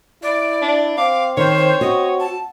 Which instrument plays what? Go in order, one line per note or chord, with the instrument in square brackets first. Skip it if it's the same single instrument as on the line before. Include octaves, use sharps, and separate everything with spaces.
[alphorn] E4 [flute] D5
[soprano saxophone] D4
[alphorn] C4 [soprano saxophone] F5 [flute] D6
[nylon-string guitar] D#3 [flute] C5 [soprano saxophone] C#5
[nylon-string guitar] F#4 [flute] D#5
[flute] A5